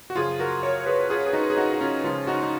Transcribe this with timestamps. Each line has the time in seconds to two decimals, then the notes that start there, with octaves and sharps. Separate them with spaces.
0.10 F#4
0.16 F#2 C#3 F3 F4 G#4
0.40 F#4 A#4
0.63 A#4 C#5
0.86 G#4 B4
1.10 F4 G#4
1.27 G#4
1.33 D#4 F#4
1.50 G#4
1.57 D#4 F#4
1.73 F#4
1.81 C#4 F4
2.04 C#2 C#3 F3 C#4 F4
2.27 D#4 F#4
2.43 D#4